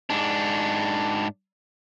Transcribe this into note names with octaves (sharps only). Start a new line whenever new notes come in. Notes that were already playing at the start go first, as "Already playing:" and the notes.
G#2 D4